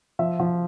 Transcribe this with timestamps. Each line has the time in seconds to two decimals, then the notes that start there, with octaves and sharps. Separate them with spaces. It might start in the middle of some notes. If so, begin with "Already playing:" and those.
0.19 F3 E5
0.40 F3